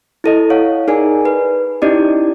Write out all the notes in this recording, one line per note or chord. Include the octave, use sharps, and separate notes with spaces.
E4 A4 D#5
C#5 F5 F#5
D#4 G#4 A#4 D5 G#5
B4
C#4 D#4 E4 G4 D5 D#5